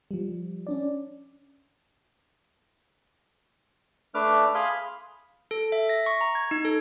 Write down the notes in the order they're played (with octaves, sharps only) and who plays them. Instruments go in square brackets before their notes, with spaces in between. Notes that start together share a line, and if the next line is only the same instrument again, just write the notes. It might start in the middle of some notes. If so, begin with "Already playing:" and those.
[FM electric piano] F3 G3
C#4 D4 D5
[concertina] A3 D4 B4 D6 F6
G#4 F5 G#5 B5 C6 F6
[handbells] A4
E5
A#6
C#6
A#5
G#6
D#4
A4